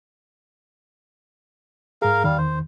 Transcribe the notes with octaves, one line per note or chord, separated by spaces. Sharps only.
G#2 G#4 A#4 F5
E2 D#3 G3 F5
C5